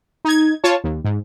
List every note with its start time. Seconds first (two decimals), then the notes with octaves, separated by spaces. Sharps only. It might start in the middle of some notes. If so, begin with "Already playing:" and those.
0.25 D#4 G#6
0.64 F4 C#5 A5
0.84 D#2
1.04 G#2